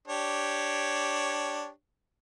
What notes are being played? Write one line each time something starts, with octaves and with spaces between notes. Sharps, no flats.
D4 G4 C#5